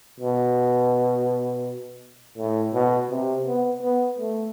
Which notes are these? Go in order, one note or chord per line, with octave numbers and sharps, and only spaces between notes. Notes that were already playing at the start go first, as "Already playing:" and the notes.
B2
A2
B2
C3
B3
B3
A3